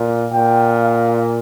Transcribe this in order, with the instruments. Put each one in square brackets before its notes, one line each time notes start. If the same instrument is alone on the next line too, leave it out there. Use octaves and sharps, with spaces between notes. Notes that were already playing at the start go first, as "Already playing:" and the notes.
Already playing: [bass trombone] A#2
[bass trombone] A#2 [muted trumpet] G5
[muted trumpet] F5